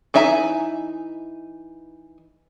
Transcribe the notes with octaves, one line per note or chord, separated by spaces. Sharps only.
E3 D#4 E5 G#5 A#5